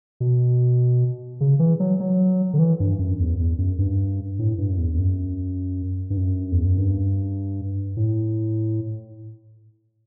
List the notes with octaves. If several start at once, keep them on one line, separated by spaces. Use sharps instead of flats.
B2
C#3
E3
F#3
F#3
D3
E3
G2
F#2
E2
E2
F#2
G2
A2
G2
F#2
E2
E2
F#2
G2
F#2
E2
F#2
G2
A2